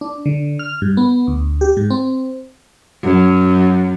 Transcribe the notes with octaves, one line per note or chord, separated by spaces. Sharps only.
D4
D3
F6
G2
B3
D2
G4
G#2
C4
F#2